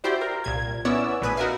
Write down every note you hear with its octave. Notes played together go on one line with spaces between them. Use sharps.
E4 F#4 G4 C5 D5
A#4
C2 A#2 G#6
B3 C#4 E4 C#5 D5 E6
A#1 A2 B4 G#5 D#6
D#4 F#4 A#4 B4 E5 F5